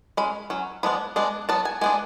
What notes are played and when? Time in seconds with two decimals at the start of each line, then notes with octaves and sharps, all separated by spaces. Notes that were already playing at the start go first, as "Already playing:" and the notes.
0.17 G#3 C#4 B5
0.50 F#3 C#4
0.83 F3 G#3 B3 D4 B5
1.16 G#3 B3 D4
1.49 F#3 B3 A5
1.65 G#5
1.81 G#3 B3 D4 G#5